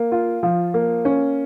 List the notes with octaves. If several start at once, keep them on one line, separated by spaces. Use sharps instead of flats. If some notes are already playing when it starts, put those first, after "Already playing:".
Already playing: A#3
F4
F3
A#3
C#4